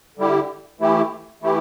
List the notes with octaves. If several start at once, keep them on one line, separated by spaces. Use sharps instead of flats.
D3 G3 E4 G4
E3 A3 E4 G4
E3 A3 E4 G4